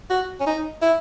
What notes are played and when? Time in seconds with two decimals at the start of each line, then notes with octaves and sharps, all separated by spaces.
0.10 F#4
0.40 C#4
0.47 D#4
0.82 E4